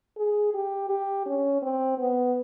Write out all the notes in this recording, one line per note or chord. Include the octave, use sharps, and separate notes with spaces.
G#4
G4
G4
C#4
C4
B3